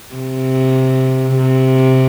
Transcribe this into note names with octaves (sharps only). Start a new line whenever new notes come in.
C3
C3